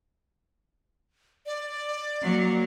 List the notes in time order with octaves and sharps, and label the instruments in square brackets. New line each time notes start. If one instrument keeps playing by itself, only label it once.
[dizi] D5
[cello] F#3 A#3